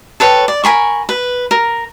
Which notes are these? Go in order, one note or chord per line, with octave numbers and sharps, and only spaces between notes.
A4 B4 C#5 G5
D5
A#4 G#5 B5 C#6
B4
A#4